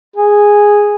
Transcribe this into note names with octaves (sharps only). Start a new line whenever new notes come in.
G#4